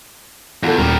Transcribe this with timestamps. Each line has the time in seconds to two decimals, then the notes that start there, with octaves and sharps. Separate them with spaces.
0.63 E2 F4 A4
0.78 D#1 G3 A#4